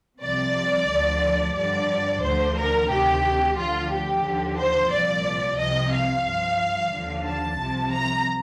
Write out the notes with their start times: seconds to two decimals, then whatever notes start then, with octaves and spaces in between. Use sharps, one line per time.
0.20 C2 C3 F3 D5
0.87 D2 D3 F3
1.54 G2 D3 F3 D5
2.21 D2 D3 F3 C5
2.55 A#4
2.88 D2 C3 D#3 G4
3.56 D2 D3 F3 F4
3.90 G4
4.23 D#2 D3 F3
4.56 C5
4.90 C2 A#2 F3 D5
5.57 C2 C3 F3 D#5
5.91 F5
6.23 G2 F3
6.92 D#2 D3 F3
7.24 A5
7.58 C2 C3 F3
7.91 A#5